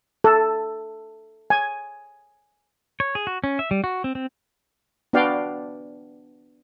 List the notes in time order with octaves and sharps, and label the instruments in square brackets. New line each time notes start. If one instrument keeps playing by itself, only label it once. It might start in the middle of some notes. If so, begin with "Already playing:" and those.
[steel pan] A4
G#5
[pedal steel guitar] C#5
G#4
F#4
C#4
E5
G3
F#4
C4
C4
[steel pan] B3 D4 F#4 D5 F5 G5